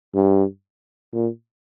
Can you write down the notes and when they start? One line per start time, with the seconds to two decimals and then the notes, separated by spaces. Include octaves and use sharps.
0.14 G2
1.13 A#2